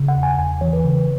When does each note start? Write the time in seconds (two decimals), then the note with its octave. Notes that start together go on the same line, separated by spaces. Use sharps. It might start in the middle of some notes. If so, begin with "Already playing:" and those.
Already playing: C#3
0.08 F#5
0.16 E2
0.23 G#5
0.38 E2 G#5
0.61 E3 C#5
0.73 B4
0.84 C#3